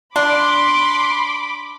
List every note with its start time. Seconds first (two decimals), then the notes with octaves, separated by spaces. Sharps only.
0.16 D4 B5 C6 D6